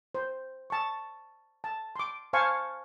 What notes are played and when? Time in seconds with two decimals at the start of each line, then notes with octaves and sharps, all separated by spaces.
0.15 C5
0.70 A5 C#6
1.64 A5
1.96 C6 D6
2.33 C5 F5 G#5 A5 C#6